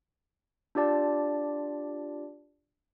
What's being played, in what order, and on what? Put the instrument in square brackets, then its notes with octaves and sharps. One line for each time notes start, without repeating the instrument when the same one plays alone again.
[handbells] D4 F4 G4 D5 A5